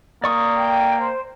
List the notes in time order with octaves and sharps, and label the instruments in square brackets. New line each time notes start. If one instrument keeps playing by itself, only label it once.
[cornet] A#3 [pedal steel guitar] D5 C#6 D#6
[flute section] G5
C5